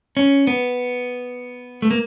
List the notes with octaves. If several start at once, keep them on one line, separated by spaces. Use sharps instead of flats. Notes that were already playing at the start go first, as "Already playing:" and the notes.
C#4
B3
A3
A#3